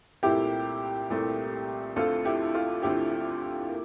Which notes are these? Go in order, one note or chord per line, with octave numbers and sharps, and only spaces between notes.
C2 A#2 A3 C4 E4 G4
C2 A#2 A3 C4
D2 D3 A3 C4 F4 A4
E4 G4
F4
D2 D3 A3 C4 E4 G4
A#3